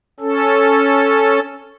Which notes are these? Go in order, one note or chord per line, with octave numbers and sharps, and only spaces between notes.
C#4 A4